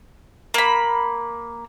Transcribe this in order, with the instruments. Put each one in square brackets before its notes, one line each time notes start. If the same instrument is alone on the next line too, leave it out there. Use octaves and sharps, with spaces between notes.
[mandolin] A#3 B5